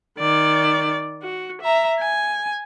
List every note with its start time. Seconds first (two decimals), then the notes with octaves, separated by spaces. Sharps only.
0.19 D#3 D5
1.22 F#4
1.62 E5 A#5
2.00 G#5